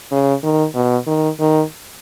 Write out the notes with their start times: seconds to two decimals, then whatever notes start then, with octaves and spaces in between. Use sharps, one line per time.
0.11 C#3
0.43 D#3
0.75 B2
1.07 D#3
1.40 D#3